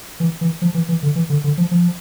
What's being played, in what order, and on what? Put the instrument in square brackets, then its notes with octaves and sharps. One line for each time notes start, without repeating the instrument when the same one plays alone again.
[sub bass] E3
E3
F3
E3
E3
D3
E3
D3
D3
F3
F3